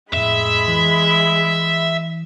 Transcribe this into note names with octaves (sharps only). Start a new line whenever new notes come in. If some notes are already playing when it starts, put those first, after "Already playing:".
F2 A2 G#3 E5 B5
E3